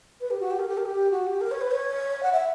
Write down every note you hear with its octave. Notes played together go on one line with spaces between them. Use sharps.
B4
G4
F#4
G4
A#4
G4
A#4
G4
F#4
G4
A#4
C#5
B4
C#5
F#5
E5